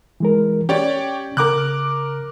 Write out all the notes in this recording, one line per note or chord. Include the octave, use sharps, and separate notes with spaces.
E3 G#3 A#4
C#4 G4 C#5 D5
C#3 A#4 D6 F#6